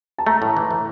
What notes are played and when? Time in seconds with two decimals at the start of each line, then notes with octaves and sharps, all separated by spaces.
0.18 A5
0.27 A3 A#5
0.42 A2
0.57 E3
0.71 A2